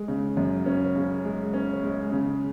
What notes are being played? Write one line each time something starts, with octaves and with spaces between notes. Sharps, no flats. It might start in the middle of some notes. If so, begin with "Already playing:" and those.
Already playing: G#3
C#3
F#2
C#4
C#3
G#3
C#4
G#3
C#3